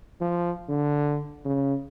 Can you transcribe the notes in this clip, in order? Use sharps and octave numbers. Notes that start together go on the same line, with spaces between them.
F3
D3
C#3